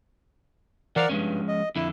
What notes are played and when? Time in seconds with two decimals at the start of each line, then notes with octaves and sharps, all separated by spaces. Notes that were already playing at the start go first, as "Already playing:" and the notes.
0.96 E3 A#4 C5 D5 F5 F#5
1.10 G2 F3 G#3 C#4
1.48 D#5
1.76 F2 D3 E4